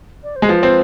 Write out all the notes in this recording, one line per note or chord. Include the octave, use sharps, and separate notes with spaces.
D5
C5
G#3
F3 B4
C4